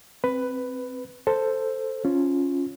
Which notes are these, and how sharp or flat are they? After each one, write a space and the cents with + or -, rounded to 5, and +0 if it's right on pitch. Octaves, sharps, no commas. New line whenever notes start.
C4 +0 B4 +10
A4 +10 C5 +0
C#4 +0 F4 +0